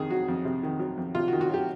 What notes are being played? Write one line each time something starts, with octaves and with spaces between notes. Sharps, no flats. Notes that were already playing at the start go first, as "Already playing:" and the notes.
Already playing: F2 C3 D#3 G#4
F#3 F#4
F2
C3
D#3
F#3
F2
C3 F4
F#4
D#3
F#4
F#3 G4